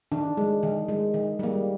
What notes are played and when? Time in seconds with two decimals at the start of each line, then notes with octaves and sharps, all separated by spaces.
0.12 D#3 D4
0.37 G#3
0.63 D#3
0.88 G#3
1.14 D#3
1.39 G3 A#3